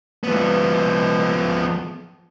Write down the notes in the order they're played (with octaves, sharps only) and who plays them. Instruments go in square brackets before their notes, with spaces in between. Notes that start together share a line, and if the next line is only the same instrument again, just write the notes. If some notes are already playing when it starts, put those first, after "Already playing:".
[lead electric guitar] F3 B3